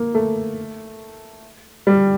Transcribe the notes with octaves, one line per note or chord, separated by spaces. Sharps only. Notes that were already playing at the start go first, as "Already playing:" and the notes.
Already playing: A#3
A3
G3